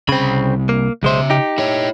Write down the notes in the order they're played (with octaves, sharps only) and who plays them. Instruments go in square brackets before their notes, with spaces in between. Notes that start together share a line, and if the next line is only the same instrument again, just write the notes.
[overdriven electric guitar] C2 B5 [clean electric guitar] C#3 C4
[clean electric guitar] A#3
[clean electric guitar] B1 G#3 C5 [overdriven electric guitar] C#3 E5
[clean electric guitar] D#4 G4
[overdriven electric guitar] E4 C#5